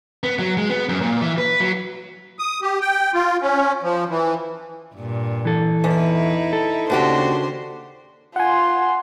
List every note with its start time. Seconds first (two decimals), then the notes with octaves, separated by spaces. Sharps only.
0.24 B3
0.39 F#3
0.57 G#3
0.70 B3
0.89 F#2
1.01 A#2
1.22 E3
1.38 B4
1.60 F#3
2.39 D#6
2.62 G4
2.81 G5
3.14 F4
3.42 C#4
3.83 F3
4.09 E3
4.95 G2 A#2
5.45 E3 A4
5.84 E2 D#4 E4
6.53 A4
6.90 D#2 C#3 D4 F#4 G4 C5
8.36 F4 F#5 G#5 C6